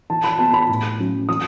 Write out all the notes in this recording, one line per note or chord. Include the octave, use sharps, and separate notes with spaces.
E3 A5
B5
B3 A5
B5
A2
F#3 C#4
E3 D#6